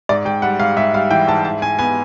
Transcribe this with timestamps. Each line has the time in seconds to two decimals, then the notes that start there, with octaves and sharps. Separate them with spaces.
0.09 G#2 D5
0.25 G#2 G5
0.42 G3 F#5
0.59 G#2 F5
0.76 G#2 E5
0.94 G3 F5
1.11 E3 G5
1.27 G#2 A5
1.45 E4 A5
1.62 E4 G#5
1.79 B3 G#5